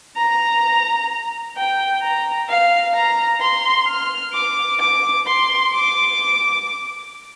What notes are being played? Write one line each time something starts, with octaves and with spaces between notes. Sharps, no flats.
A#5
G5
A#5
F5
A#5
C6
F6
D6
D6
C6
D6